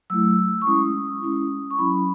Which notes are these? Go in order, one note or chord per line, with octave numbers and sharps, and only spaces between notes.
F#3 A3 E4 E6
C#6
G#3 C#4 E4 D#6
G#3 C#4 E4
C#6
F#3 C#4 E4 B5